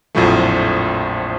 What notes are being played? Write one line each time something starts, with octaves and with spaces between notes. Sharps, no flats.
A#1 F2 A2 F3 F#3 A3